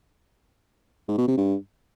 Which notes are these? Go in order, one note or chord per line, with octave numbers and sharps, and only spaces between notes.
G#2
B2
C3
G2